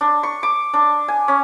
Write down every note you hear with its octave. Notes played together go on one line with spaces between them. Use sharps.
D4
C#6
D6
D4
G#5
C#4